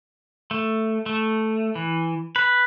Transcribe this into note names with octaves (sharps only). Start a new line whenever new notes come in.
A3
A3
E3
B4